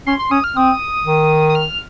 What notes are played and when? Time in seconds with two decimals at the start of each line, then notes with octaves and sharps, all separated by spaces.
0.07 C#4 C6
0.19 C6
0.31 C#4 D#6
0.44 F6
0.56 C4 D#6
1.06 D#3
1.49 D#6
1.55 F6